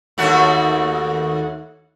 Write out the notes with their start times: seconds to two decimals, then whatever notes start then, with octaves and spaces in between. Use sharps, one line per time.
0.18 D#2 A3 F#4